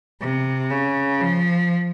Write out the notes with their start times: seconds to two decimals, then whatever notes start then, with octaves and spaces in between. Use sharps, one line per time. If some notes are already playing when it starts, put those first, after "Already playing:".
0.21 C3
0.71 C#3
1.21 F3